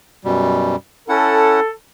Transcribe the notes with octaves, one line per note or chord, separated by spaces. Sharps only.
F#2 B2 G3
C#4 E4 A4 F#5